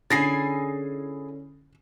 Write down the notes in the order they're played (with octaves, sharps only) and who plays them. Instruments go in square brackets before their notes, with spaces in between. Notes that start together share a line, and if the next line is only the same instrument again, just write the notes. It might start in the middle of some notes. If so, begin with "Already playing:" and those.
[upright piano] D3 C#4 [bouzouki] E4 G#4 G#5 [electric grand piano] A6 A#6 C7